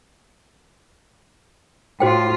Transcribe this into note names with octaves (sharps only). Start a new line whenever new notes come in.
A2 F4 F#4 C5 G5